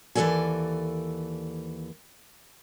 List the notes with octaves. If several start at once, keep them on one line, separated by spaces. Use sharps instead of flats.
D#2 E3 F3 A4 D5 G#5